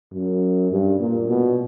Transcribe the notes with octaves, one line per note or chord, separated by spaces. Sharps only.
F#2
G2
A#2
B2